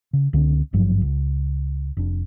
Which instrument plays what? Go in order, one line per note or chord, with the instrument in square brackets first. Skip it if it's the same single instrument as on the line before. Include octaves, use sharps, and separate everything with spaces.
[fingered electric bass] C#3
C#2 D3 C4
G#1 G2 F3 F#3
C#2
F1 D4